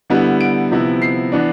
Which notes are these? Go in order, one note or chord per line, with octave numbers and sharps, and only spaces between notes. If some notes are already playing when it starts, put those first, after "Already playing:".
D3 G3 B3 E4
D7
C3 F3 B3 E4
C7
E3 B3 D4